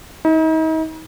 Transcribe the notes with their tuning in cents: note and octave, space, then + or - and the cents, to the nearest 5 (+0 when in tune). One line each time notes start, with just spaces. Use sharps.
D#4 +40